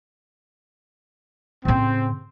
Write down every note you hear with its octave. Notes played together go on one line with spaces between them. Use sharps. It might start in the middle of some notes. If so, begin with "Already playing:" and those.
A2 C#3 C4